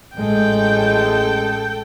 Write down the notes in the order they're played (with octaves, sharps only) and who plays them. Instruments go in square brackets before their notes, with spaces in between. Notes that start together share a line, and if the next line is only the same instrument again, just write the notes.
[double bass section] A1 G#3 [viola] A4 G5